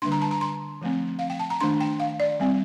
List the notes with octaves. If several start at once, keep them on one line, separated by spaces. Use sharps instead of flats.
D3 G3 A#3 D4 C6
A#5
A5
A#5
C6
F3 A3 C4
F5
G5
A5
A#5
D#3 A3 D4 C6
G5
F5
D5
G3 C4